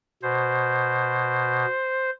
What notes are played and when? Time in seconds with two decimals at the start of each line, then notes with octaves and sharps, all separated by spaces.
0.23 B2 C5